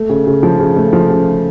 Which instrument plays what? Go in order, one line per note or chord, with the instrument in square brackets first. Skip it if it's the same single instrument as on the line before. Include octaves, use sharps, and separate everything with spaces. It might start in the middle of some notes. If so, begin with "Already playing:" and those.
Already playing: [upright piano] A3
C#3
C#3
F3
C#3
A3
F3
C#3